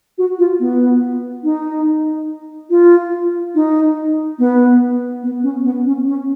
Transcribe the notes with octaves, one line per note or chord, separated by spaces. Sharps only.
F#4
F4
B3
D#4
F4
D#4
B3
B3
C#4
B3
C#4
C#4